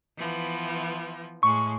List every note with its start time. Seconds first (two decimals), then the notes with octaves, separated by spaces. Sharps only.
0.18 E3 F3 B3
1.43 A2 G#3 C#6